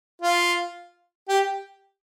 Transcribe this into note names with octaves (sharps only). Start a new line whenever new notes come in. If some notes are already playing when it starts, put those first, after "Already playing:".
F4
G4